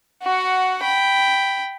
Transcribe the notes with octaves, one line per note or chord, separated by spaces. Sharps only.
F#4 F#5
G5 B5